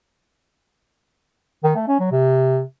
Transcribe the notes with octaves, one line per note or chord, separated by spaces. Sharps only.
D#3
A3
C#4
F#3
C3